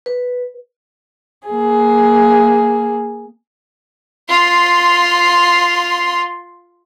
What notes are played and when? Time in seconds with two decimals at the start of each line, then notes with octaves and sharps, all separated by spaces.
0.06 B4
1.47 A#3 G#4
4.29 F4 C6